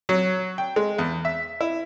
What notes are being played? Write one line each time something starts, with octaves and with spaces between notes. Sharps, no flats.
F#3
G5
G#3
E2
E5
E4